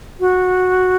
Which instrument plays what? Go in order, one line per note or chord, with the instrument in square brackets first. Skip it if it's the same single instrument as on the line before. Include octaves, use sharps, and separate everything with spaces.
[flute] F#4